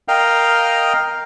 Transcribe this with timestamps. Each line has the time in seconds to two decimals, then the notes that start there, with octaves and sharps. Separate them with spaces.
0.08 A#4 D#5 F5 G5